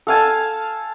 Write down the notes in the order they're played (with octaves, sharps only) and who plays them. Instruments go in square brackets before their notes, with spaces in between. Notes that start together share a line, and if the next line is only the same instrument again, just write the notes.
[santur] A4 F5 G#5 A5